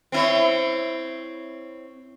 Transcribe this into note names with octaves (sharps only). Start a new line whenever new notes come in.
C4 E4 C#5